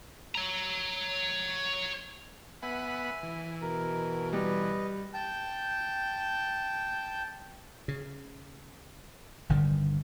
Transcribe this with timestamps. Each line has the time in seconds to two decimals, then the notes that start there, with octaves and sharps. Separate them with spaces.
0.35 C#5 A#5
2.63 B3 E5 F#5 G#5 B5
3.23 E3
3.61 B2 A#4
4.33 G3 B4 D#5
5.14 G5 A5 G6
7.88 C#3
9.49 G1 D3 D#3 G3